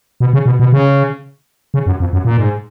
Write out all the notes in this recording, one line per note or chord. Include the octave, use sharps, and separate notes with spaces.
B2
C#3
B2
B2
C#3
C#3
F#2
F2
F#2
A#2
G#2